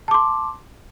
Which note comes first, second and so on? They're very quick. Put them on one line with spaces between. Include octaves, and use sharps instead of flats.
A5 D6 C6